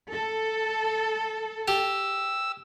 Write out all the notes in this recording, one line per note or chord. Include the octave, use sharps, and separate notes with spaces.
A4
G4 E6